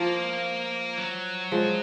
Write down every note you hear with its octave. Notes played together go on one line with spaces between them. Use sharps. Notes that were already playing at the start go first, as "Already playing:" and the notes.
Already playing: F3 A#3
F#3
F3 G#3